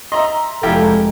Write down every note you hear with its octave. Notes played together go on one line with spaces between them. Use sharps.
D#5 E5 A#5 C6
F1 F3 G#3 E4 G4 A4 G5 A#5